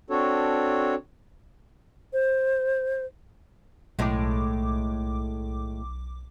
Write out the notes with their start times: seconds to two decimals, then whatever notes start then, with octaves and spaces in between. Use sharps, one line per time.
0.10 C4 D4 F#4 A4 C#5
2.13 C5
3.99 B1 A2 G#3 A3 D6